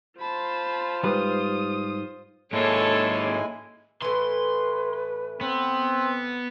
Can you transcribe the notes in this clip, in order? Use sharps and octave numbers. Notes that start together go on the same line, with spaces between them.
F4 C5 A5 B5
G#2 G3 B4 D#6
G#2 G#3 A#3 E4 A4 C#5 G#5 A5
A2 E3 B4 C6
B3 C4